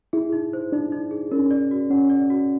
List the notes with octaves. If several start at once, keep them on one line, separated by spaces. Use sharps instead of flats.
E4 G#4
D#4
C5
D4 D#4
D#4
G#4
C#4 A#4
D5
F#4
C#4 F#5
D5
F#4